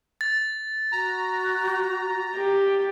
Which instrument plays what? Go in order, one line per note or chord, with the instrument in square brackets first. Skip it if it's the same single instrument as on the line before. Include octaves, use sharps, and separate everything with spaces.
[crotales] A6
[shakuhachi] F#4 [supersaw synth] A#5
[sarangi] G4